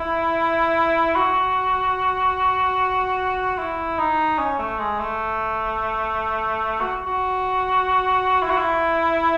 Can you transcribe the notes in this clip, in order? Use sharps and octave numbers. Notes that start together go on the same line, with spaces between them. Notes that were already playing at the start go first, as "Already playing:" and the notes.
Already playing: E4
F#4
E4
D#4
C#4
A3
G#3
A3
F#4
F#4
E4
F#4
E4